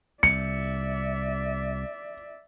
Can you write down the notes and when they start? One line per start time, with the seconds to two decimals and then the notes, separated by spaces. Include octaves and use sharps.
0.23 C2 D5 E5 C#7